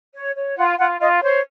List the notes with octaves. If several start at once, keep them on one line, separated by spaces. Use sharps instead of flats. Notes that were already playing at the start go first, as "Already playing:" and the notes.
C#5
C#5
F4 F#5
F4 F#5
F4 D#5
C5 C#5